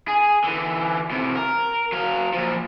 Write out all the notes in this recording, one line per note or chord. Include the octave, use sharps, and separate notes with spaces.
G#4
D3 E3
A2 C3
A#4
F#3 F5
A#2 F3